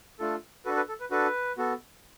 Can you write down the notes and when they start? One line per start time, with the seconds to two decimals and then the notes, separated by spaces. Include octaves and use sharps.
0.19 A3 D4 F4 A4
0.65 D4 F#4 A4 B4
0.77 B4
0.88 A4
1.00 B4
1.11 D4 F#4 A4 B4
1.58 B3 F#4 A4